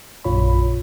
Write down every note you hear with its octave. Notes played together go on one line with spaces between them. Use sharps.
A#1 F#2 A#2 F4 C#5 B5